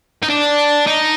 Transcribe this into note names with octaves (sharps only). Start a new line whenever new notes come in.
D#4
D4
D#4